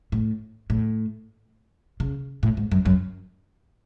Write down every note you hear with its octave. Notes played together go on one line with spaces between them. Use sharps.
A2
A2
C#3
A2
G#2
F#2
F#2